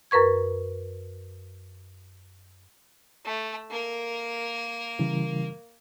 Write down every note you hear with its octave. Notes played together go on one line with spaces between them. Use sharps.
F#2 A#4 B4 C#6 G#6
A3
A#3 A#4
C#3 E3 G3